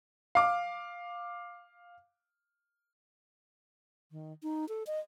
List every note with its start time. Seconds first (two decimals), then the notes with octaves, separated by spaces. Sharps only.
0.35 F5 D6
4.11 D#3
4.43 D#4
4.69 A4
4.87 D#5